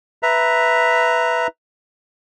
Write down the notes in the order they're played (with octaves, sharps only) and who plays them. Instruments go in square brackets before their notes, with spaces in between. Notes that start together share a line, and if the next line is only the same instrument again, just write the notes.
[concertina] B4 E5 A#5